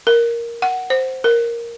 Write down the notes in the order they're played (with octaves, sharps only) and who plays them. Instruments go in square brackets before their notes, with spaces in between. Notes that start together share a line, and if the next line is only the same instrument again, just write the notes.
[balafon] A#4
F#5
C5
A#4